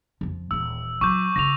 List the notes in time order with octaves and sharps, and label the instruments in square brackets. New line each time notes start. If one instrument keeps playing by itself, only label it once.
[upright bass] F2 F3
[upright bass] D#1 E3 [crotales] E6
[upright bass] F#3 F4 [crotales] C#6 D6 G6
[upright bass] C#3 F4 [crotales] A#6 F7